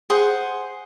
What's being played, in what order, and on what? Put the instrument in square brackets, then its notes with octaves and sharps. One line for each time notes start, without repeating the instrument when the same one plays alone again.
[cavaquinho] G#4 C5 F#5